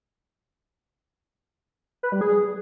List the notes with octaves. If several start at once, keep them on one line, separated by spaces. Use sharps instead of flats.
B4
G3
G#4